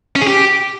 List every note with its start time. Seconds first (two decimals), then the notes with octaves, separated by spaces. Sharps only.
0.16 C#4
0.21 G#4
0.27 G4